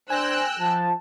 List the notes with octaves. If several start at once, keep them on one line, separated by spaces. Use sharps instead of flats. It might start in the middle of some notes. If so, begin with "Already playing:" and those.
D4 C5 G5 G#5 E6 F#6 A#6
F3 A5